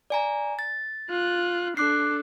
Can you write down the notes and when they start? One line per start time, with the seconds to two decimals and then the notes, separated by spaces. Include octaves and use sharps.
0.10 D5 G#5 A#5
0.59 A6
1.10 F4 F#6
1.77 D4 A4 D6 F#6 C7